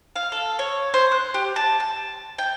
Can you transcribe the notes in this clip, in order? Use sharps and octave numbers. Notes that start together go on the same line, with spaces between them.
F5
A4
C#5
C5
F#6
G4
A5
A5
G5